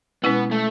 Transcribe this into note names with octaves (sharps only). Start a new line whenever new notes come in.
B2 G#3 B3 C#4 E4
A3